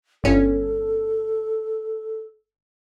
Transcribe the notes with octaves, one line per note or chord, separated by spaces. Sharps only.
G1 C#4 A4